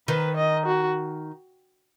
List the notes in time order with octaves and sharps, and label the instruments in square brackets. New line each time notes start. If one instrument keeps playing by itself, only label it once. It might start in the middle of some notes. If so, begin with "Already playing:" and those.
[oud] D#3 [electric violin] B4
[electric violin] D#5
F#4